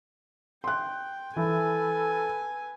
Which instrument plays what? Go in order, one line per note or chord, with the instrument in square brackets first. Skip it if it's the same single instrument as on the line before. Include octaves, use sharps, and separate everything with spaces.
[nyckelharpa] G5 [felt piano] C6 F#6
[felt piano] E3 [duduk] A4 [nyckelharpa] B4 G#5